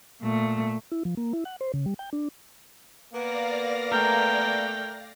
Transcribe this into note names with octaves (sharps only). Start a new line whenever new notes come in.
A#2 A3
E4
F3
A#3
E4
F#5
C5
C#3
G3
G5
D4
A#3 B3 D5 F5 A#6
A3 A#4 G5